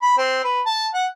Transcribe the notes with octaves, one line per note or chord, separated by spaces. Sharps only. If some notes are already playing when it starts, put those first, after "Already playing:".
B5
C4
B4
A5
F#5